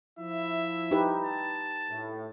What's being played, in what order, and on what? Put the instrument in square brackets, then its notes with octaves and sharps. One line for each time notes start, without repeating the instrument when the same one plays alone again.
[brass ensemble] F3 E4 [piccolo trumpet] E5
[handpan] D#4 G4 B4
[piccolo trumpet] A5
[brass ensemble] A2